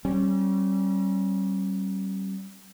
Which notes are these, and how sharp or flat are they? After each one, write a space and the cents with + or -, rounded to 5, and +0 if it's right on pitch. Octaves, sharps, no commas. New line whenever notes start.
G3 -30 C#4 -35